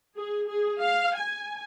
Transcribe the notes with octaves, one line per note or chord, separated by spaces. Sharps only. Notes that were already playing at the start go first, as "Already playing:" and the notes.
G#4
G#4
F5
G#5